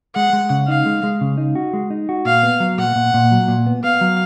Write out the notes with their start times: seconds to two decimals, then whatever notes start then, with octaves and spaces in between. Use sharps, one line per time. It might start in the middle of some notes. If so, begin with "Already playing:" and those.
0.15 G#3 F#5
0.33 G#3
0.50 C#3
0.67 D#4 F5
0.86 G#3
1.03 G#3
1.21 C#3
1.37 D#4
1.55 F#4
1.73 G#3
1.90 D#4
2.09 F#4
2.25 A#2 F5
2.43 B3
2.60 F#3
2.78 A#2 F#5
2.96 A#2
3.14 A#2
3.31 F#3
3.48 A#2
3.67 B3
3.83 B3 F5
4.01 F#3